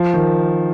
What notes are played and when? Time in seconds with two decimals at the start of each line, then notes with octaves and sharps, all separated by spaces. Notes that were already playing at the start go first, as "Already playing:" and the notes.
Already playing: F3
0.14 D#3